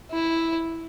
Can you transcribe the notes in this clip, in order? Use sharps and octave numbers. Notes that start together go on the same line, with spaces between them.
E4